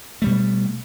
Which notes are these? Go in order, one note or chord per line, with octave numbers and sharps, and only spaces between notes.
B2 G3 A3